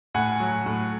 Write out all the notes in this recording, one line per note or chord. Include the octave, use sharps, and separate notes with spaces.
A2 F#5 G#5
F#3
A2